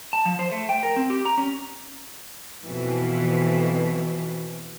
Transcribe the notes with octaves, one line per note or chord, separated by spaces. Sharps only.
A5
F3
C5
A3
G5
A#4
C4
G4
A#5
C#4
F2 B2 E3